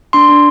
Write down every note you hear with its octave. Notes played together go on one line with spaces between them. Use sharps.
D4 C6
D4